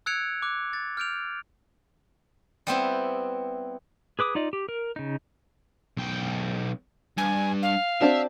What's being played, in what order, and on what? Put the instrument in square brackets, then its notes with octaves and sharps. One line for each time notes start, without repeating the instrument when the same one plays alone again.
[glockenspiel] E6 F#6 G#6 C#7 D7 F7
D6 F#6
A6
F6 G6 D7 F7
[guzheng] G3 B3 C4 E4
[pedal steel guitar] G#4 B4 D6 D#6
D#4 F4 D5 D#5
G4
A#4
C#3 D#4
[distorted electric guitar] B1 G5
[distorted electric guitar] G2 [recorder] G#5
[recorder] F5
[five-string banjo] C4 D4 F#4 [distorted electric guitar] E5